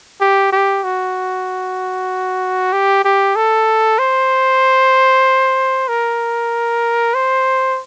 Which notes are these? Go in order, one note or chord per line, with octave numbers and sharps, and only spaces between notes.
G4
G4
F#4
G4
G4
A4
C5
A#4
C5